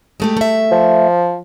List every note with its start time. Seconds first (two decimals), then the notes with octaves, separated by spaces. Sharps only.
0.20 G#3 A3 G4
0.37 A3 E5
0.71 F3